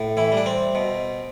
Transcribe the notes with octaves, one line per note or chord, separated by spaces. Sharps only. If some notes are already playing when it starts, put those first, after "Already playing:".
Already playing: A2
E3 E4
G3 D4
C4
B2